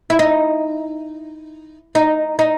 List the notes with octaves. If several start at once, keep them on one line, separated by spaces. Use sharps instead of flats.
E4
D#4
D#4
D#4